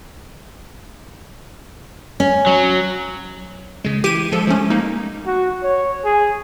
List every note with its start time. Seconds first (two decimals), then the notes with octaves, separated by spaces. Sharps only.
2.20 C#4
2.47 F#3
3.84 C#3 G#3
4.04 E3 G4 D#7
4.32 F3 G#3 A4
4.47 F3 A3 C#4
4.70 A#3 D#4
5.26 F#4
5.63 C#5
6.05 G#4